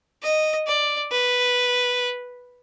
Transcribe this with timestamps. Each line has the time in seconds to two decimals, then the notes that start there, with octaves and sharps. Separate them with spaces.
0.23 D#5
0.67 D5
1.12 B4